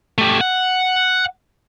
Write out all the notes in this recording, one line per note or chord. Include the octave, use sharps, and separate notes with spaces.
A3 G4
F#5